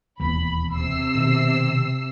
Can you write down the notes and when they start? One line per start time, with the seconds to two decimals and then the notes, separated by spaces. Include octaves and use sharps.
0.20 E1 D#2 E3 B5
0.75 C3 E6 C7
1.15 B2 D#3